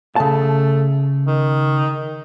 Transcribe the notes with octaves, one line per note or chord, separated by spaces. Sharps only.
C#3 A3 A5
D#3